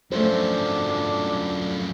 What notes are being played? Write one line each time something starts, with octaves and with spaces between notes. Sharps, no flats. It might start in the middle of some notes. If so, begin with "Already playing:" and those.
F#2 F3 A3 D4 C5